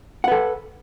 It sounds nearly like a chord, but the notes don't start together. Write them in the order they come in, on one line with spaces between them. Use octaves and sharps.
F#5 B4 A4